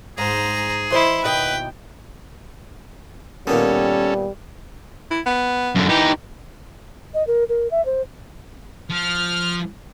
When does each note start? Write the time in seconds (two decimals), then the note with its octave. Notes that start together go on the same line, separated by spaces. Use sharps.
0.18 G#2 G#4 C5 A#5
0.91 E3 E4 C5 D#5 C6
1.24 D#2 B2 B4 D#5 G5
3.47 A#2 D#3 G3 B3 C#4 A4
5.11 E4
5.26 B3
5.75 F#2 D3
5.89 E3 D#4 G4
7.14 D#5
7.27 A#4
7.49 A#4
7.71 E5
7.86 C5
8.90 F3 F6